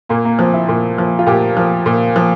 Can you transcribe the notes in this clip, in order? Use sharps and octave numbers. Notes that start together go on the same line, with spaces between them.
A#2 A#3
A#3
F3 C4
E4
A#2
F3
F4
A#2 G4
F3
A#2
F3